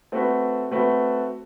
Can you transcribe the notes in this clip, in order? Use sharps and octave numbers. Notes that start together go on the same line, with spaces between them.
A3 C4 F#4 B4
A3 C4 F#4 B4